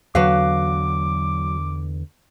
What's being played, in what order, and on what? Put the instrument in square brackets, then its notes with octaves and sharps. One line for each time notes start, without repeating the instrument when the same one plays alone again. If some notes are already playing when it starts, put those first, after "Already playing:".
[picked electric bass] E2 D3 [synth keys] F#3 [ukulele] F#4 B4 F5 [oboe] D6